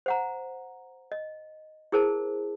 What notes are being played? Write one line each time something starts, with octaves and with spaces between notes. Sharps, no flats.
C5 F#5 A#5
D#5
E4 G#4 A#4 C5 A5